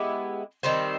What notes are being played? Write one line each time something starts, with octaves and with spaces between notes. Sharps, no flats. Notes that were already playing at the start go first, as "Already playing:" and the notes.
Already playing: G#3 B3 E4 G4
D#3 G3 C4